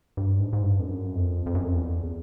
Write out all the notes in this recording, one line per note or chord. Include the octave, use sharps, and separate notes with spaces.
G2
G#2
G#2
G2
F2
F#2
F2
F2
F#2
F2
E2